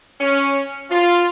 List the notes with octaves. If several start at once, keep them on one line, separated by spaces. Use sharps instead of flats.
C#4
F4